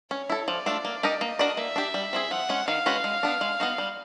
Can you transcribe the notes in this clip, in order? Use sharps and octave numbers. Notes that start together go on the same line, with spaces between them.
C#4 C#5
E4 A4
F3 D5
A3 D4 F4
A#3
D#4 G4 A#4 D#5
A#3 D#5
D4 F#4 A#4 D5
A#3 E5
D4 G4
G3
C4 E4 G#4
F3 F#5
G#3 C#4
D#3 F5
G#3 C#4 F#4 B4
G#3
B3 D4
G#3
B3 D#4 F#4
G3